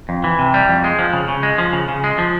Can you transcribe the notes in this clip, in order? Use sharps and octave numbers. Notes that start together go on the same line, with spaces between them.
F2
E3
C3
G3
F2
G#3
F3
C#3
C#3
G#3
F3
C#3
C#3
G#3
F3